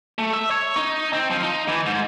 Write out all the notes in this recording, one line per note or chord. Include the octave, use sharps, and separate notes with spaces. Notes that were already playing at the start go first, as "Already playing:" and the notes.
A3
E5
C#5
D#4
C4
F3
D#4
E3
G#2